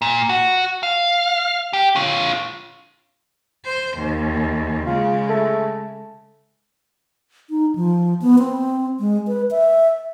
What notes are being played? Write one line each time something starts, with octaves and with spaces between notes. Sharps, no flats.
A#2
F#4
F5
G4
F4 C#5
C5
D#2
C#3 G#3 F4
A3
D#4
F3
B3
C4
G#3
B4
E5